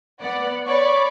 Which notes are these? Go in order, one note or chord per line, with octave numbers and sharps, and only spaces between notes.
B3 D5 F#5
C#5 D5 B5 C#6 D6